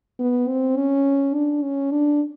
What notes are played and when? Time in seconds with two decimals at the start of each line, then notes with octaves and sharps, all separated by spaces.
0.19 B3
0.48 C4
0.77 C#4
1.34 D4
1.62 C#4
1.91 D4